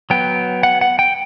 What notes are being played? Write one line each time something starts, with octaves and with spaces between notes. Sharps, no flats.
F#3 B3 G5
F#5
F#5
G5